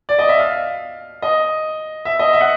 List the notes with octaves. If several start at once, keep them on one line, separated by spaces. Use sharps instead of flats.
D5
D#5
E5
F5
D#5
E5
D#5
E5
F#5